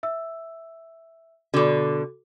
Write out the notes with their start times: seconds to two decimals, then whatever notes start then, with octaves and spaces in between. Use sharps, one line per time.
0.03 E5 E6
1.54 B2 D3 F#4 A4 D6